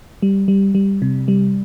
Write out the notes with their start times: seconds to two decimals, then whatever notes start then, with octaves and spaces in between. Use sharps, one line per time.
0.22 G3
0.48 G3
0.75 G3
1.02 C3
1.28 G3